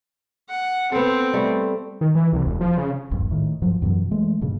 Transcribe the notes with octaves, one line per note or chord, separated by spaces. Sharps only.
F#5
B3 C4 A4
G3 A3
D#3
E3
C2
E1
F3
C#3
D#1 A#1 G2
A2 D#3
G2 F3 F#3
F#2 B2 E3 F#3
E3 G#3 A3
G2 A#2 C#3